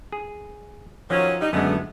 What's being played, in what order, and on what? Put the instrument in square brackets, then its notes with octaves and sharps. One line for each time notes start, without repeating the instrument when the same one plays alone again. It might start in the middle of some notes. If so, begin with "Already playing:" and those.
[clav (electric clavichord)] G#4
[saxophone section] D#3 F#3 C#4 [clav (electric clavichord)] F3
[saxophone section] G3 D#4
[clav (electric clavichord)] F#2 D3 G#3 [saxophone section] A3 B3